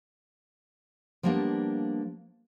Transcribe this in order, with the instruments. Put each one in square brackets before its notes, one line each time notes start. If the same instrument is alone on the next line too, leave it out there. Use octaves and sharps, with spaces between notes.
[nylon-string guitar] F3 G3 A#3 B3 D4